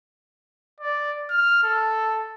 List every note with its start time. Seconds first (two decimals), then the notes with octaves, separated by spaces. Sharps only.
0.80 D5
1.30 F6
1.63 A4